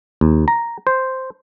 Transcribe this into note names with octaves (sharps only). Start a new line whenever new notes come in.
D#2
A#5
C5